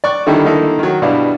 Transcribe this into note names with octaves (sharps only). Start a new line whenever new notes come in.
D5 C#6 F#6
D3 D#3 G3 D#4 E4 A4
D3 D#3 A#3 D#4 E4 A4
D#3 F#3
G2 B2 G3 D4 E4 F5